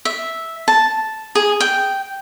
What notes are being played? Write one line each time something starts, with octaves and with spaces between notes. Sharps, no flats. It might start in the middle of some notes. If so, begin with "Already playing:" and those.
E5
A5
G#4
G5